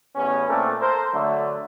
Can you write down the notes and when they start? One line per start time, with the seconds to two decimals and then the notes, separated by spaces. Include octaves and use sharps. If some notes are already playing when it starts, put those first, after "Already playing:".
0.16 A1 E2 B3 C#4
0.49 A#2 A3 C4 D4 A#4
0.81 A4 A#4 C5
1.13 D3 F#3 A3